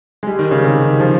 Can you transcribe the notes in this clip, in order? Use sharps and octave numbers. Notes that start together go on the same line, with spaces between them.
G#3
G3
D#3
C#3
C3
D#3
F3